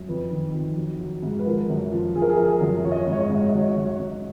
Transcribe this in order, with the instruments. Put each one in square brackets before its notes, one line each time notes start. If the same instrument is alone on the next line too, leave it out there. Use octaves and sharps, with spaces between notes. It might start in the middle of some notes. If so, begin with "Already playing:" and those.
Already playing: [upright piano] F#2
F2 B4
D#3
F2
F#3
F#3
G#2
B4
F3 A#4
F#2
F3
F3 G#4
A#4
G#4
F3 A#4
G#4
F#2
F3 C#5
D#5
C#5
G#2 D#5
C#5
D#5
C#5
G#2
D#5
C#5
D#5
F#3 C#5
D#5
C#5
F#2 D#5
C#5
F#2